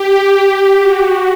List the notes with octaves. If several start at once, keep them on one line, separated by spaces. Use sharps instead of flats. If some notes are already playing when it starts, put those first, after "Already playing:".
Already playing: G4
G4
F#4